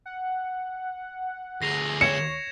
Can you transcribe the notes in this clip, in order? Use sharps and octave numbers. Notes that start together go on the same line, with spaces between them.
F#5
D2 G#4 A#6 C7 F7
C#5 G#6 C#7 E7